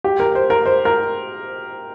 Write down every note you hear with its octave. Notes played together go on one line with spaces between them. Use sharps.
G4
A#4
C5
A#4
C5
A#4